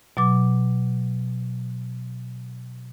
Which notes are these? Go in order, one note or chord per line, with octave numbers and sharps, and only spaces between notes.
B2 F#3 D6